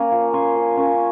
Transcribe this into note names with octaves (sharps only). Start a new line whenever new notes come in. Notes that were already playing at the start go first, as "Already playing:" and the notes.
Already playing: A#3 C#4 G#5
F3
A#3 C#4 G#5 C6
F3
A#3 C#4